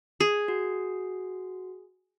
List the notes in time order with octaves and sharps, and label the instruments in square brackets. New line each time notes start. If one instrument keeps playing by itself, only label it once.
[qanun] G#4
[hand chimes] F#4